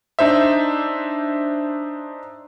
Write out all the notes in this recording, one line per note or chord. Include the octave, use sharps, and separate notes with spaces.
D4 D#4 C5 E5